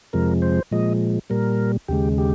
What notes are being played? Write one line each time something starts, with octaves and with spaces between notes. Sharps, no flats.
F2 C3 F3 G#3 A#4
C5
A#2 F3 G#3 D#5
A#2 G3 A#4
D#2 C#3 G#3 G4
G4